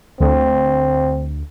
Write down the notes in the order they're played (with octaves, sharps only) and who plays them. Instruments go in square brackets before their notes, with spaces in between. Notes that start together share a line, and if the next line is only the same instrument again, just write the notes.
[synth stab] D2 [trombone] C4